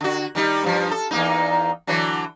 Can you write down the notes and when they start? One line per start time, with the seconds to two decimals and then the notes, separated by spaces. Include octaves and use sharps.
0.01 D3 F#4
0.35 D#3 G3 D#4
0.64 G2 F3
0.91 A4
1.11 E2 A#3 D#4
1.87 D3 E3 F#3